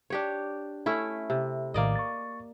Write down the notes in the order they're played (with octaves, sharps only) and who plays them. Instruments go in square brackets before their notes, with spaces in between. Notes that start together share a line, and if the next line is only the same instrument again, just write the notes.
[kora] D4 G4 C#5
A3 C#4 E4
C3
[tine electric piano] A#1 A2 D#3 [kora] A#3 D5 D#5
[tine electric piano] C#6 A6